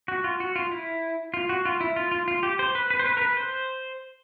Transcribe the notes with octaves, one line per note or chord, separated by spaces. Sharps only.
F#4
F4
F#4
F4
E4
F4
F#4
F4
E4
F4
F4
F4
G4
C5
B4
B4
C5
B4
A#4
B4
C5